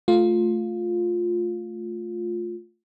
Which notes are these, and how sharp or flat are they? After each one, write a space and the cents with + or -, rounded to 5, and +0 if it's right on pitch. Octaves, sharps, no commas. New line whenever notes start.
A3 -5 F4 +10